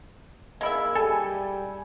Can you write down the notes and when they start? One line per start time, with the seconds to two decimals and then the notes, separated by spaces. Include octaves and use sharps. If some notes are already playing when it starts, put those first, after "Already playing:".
0.61 G#3 A#3 E4 E5
0.95 G3 A4 G#5